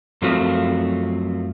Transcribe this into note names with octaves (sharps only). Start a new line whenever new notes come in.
F#2 F3 F#3 A3 C4 F4